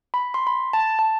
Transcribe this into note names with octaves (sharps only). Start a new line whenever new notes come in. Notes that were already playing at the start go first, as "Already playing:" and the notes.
B5
C6
B5
A5
A5